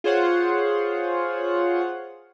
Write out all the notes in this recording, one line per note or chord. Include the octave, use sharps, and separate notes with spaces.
F4 G#4 C5 C#5 F#5